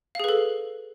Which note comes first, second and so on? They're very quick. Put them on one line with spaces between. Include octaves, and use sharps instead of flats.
F5 G#4 B4 A4